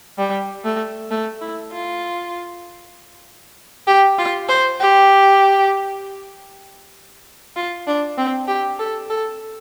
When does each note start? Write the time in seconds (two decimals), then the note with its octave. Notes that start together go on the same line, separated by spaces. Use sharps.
0.18 G3
0.64 A3
1.11 A3
1.41 E4
1.72 F4
3.87 G4
4.18 F4
4.49 C5
4.79 G4
7.56 F4
7.87 D4
8.18 C4
8.48 G4
8.79 A4
9.10 A4